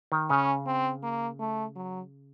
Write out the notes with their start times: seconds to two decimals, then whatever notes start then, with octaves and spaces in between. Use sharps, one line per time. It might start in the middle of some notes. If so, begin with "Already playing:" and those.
0.12 D#3
0.30 C#3 C#4
0.66 C4
1.03 A#3
1.40 A3
1.76 F#3